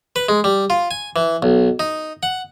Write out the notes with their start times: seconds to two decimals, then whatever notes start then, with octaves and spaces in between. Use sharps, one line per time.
0.16 B4
0.29 G#3
0.44 G3
0.70 F4
0.91 G#5
1.16 E3
1.43 B1
1.79 D#4
2.23 F#5